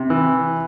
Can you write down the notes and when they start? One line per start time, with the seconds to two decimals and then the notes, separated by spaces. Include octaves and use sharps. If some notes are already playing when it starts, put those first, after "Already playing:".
Already playing: C3
0.10 E3